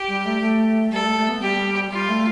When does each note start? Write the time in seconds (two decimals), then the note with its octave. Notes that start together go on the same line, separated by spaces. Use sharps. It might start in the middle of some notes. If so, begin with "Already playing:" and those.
Already playing: G4
0.08 G3
0.26 A3
0.41 A3
0.92 G3 A4
1.04 A3
1.17 A3
1.29 B3
1.42 G3 G4
1.91 G3 F4
2.09 A3